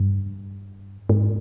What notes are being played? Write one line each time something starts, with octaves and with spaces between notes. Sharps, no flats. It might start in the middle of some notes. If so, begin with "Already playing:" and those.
Already playing: G2
G#2